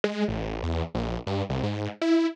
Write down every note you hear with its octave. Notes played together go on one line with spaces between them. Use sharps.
G#3
A1
E2
A#1
G2
C2
G#2
E4